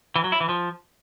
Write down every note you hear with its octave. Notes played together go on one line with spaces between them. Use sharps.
E3
F#3
E4
E3
F3